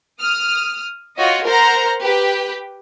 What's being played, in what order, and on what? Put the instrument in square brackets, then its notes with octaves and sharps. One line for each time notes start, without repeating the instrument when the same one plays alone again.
[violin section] D#6 F6
F4 F#4 C#5 D#5
A#4 C5 F#5 A#5
G4 B4 G5